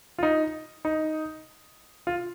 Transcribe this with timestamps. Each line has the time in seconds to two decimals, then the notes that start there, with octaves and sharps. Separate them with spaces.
0.18 F4
0.23 D#4
0.85 D#4
2.07 F4